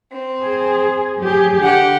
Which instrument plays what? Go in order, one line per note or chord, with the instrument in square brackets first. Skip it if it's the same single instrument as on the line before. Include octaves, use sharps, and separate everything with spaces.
[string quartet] C4
[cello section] G#4
F#3 G4 G#4
[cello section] D3 [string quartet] G4 F#5